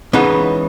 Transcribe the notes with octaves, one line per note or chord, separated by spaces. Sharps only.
C#2 C#3 E3 B3 D#4